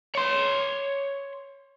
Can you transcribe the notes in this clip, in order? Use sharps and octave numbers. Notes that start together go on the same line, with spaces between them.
C#5 C6